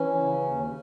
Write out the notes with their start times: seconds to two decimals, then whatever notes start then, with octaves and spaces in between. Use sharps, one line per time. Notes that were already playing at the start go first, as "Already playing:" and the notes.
Already playing: E3 C#4
0.16 C#3
0.43 D#2